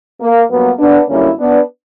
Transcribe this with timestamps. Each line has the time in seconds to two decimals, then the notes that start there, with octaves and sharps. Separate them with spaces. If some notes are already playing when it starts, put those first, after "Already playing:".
0.21 A#3
0.50 G2 F#3 A#3 B3
0.79 B3 D4
1.08 F#2 D3 G3 A#3 C#4 E4
1.39 B3 D4